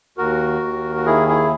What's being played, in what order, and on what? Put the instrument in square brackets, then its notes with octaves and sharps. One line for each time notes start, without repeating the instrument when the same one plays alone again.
[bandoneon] D#2 F#4 A#4
D#2
F#4
D#3 E4 G#4
E4 G#4